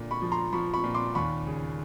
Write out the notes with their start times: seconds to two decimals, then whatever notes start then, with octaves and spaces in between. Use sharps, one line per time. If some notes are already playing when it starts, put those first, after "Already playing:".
Already playing: A#2 D3
0.11 B5 C#6
0.22 F3
0.32 A#5 C6
0.53 F3 B5 C#6
0.74 B5 C#6
0.83 A#2
0.94 C6 D6
1.15 D#2 B5 C#6
1.47 C#3